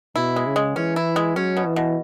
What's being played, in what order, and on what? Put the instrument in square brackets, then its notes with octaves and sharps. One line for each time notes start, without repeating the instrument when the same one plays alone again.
[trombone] B2 [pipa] E4
[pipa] G#3
[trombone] C#3
[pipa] G#3
[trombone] E3 [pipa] C#4
[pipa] E4
G#3
[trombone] F#3 [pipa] C#4
[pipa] B2
[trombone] E3
[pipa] B2